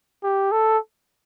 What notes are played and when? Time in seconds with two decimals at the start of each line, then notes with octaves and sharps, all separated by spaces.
0.23 G4
0.52 A4